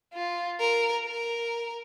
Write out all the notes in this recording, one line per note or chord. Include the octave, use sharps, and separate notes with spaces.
F4
A#4
A#4